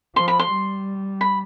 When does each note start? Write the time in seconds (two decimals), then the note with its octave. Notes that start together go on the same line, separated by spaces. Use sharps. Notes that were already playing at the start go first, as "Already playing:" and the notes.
0.16 F3 C6
0.28 B5
0.39 C6
0.51 G3
1.21 B5